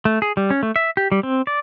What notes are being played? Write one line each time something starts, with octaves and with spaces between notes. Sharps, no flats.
A3
G#4
G3
C#4
A3
E5
G4
G3
C4
D5